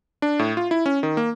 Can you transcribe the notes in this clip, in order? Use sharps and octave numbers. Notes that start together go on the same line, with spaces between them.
D4
A2
F4
E4
C#4
D#3
A#3